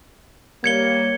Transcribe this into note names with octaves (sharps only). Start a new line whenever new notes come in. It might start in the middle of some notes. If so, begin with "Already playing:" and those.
G3 A#3 C#5 G#6 C#7 G7